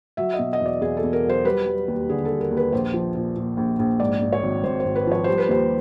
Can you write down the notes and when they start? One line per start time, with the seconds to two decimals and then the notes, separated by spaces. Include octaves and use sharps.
0.17 F#3 E5
0.34 D#5
0.39 B2
0.53 D#5
0.60 E2
0.66 D5
0.81 E2 G#4
0.97 A4
1.03 E2
1.13 A#4
1.24 F#3
1.29 C5
1.45 G3 B4
1.66 G3
1.88 D#2
2.09 D3 G#4
2.25 A4
2.31 G3
2.41 A#4
2.51 D#2
2.57 B4
2.72 A#1 C5
2.94 F3
3.15 A#2
3.36 A#2
3.57 A#1
3.79 A#1
4.00 G#2 D5
4.22 G#2
4.33 C#5
4.43 G#1
4.64 G#1 C5
4.80 C5
4.85 G#1
4.95 B4
5.07 F3 C#5
5.24 G3 C5
5.38 B4
5.48 D#2 C5